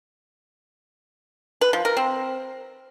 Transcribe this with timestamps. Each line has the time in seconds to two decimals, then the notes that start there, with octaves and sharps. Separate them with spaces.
1.61 B4
1.73 F3
1.85 A#4
1.97 C4